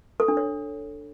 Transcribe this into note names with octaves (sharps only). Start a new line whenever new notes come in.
A4
D4
C#5